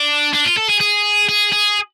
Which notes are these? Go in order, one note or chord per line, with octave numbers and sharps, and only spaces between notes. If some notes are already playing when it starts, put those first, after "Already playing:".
Already playing: D4
D4
F4
A4
G#4
G#4
G#4
G#4